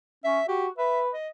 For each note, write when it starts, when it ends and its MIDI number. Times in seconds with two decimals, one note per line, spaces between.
0.24 0.40 61
0.24 0.46 76
0.48 0.69 66
0.48 0.66 67
0.78 1.10 71
0.78 1.01 76
1.13 1.29 75